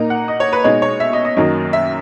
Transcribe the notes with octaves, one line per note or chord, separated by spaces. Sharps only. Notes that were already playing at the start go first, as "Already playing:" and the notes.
Already playing: A#2 A#3 D#4 A#5
F#5
D#5
C#5
B4
B2 G#3 D#4 C#5
C#5
E5
D#5
D#5
F#2 D#3 F#3 A#3 D#4
E5